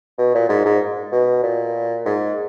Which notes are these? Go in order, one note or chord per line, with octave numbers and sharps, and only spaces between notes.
B2
A#2
G#2
G#2
B2
A#2
G#2